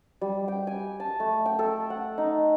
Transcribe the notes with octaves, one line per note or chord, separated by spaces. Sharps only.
G3
G5
G#5
A5
A3
G5
A4
F#5
D#4